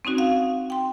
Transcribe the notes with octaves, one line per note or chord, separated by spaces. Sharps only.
C4 C#4 D#4 F#4
F5 F#5
G5 C6